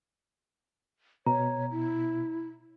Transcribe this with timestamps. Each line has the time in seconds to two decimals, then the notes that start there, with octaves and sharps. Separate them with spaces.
1.26 B2 C#5 A#5
1.71 E4